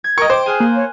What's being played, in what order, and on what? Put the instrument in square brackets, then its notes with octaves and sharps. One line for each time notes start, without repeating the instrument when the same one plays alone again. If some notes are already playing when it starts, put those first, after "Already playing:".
[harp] G#6
[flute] A#4 [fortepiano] D#5 C#6 [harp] G5 [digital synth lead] D7
[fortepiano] C5 [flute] D6
[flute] G#4 [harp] G#5 F6 F#6
[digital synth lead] A#3
[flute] C#5